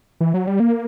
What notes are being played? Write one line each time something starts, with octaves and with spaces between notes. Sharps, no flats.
E3
F#3
G3
A#3